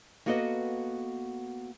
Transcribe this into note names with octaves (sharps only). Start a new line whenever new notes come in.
A#3 B3 F#4 A4 B4 D#5